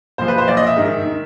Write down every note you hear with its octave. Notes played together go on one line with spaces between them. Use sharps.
A#2 F3 C5
B4
C5
A#2 F3 D5
D#5
E5
G#2 D#3
D#3